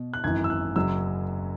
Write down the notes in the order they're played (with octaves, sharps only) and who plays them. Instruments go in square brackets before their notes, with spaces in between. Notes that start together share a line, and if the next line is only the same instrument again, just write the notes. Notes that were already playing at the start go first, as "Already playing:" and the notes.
Already playing: [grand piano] B2
F#6
G#1 F#2 E3 G#6
E6
F#6
F#1 F#2 F#3 E6